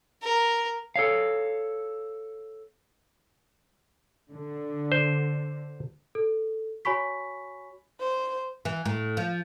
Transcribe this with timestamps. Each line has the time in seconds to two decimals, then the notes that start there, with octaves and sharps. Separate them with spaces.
0.23 A#4
0.96 A4 C#5 F5
4.32 D3
4.92 C5
6.15 A4
6.85 F#4 C#5 G#5 B5 C#6 B6
8.00 C5
8.65 E3
8.85 A2
9.17 F3